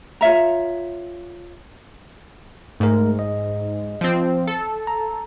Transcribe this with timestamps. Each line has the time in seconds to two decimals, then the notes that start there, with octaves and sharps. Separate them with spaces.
0.21 F4 C#5 E5 A#5
2.80 G#2 A3 A#4
3.19 D#5
4.01 F3 C4
4.47 A4
4.87 A#5